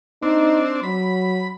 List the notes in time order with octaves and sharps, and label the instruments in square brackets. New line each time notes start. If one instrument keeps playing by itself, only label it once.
[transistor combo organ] C4 D4 [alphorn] D#4
[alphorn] F#3 [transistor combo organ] B5